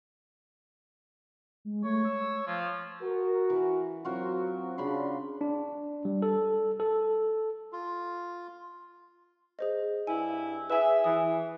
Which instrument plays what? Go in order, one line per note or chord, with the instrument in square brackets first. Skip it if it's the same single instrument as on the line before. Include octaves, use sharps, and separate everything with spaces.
[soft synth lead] G#3
[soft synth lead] A3 [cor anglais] C#5
[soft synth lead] E6
[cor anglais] F3
[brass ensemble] F#4 A#4
[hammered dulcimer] E3
[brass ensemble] F#3 C4 [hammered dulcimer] F4 F#4 A#4
[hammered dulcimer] C#3 B5 C6 [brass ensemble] D4
[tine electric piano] D4
G3
A4
A4
[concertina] F4
[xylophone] G#4 C5 D#5
[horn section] G2 E4 [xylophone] G#5
[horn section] G#4 E5 [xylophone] B4 G#5
[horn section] E3 [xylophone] D#6